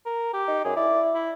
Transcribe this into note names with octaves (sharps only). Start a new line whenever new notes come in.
A#4
G4
D#4
F#2 G#4
E4 D5
E4